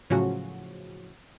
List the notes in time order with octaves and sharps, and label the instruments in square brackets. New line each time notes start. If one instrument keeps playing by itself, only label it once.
[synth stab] A2 C#3 F3 F#3 C#4 F#4